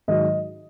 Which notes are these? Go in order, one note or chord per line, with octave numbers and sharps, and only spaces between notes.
G#2 D#3 F#3 D#5